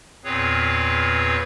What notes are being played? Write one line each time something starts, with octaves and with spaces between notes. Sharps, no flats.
E2 A#2 C4 G#4 B4 C#5